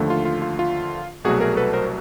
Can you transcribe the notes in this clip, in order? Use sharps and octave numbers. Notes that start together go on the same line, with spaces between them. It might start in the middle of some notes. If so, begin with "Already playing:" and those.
Already playing: D#2 D3 F3 A3
F4
F4
F4
F4
C2 B2 F#3 A3 F#4 G#4
G#4 A#4
A4 B4
A#4 C5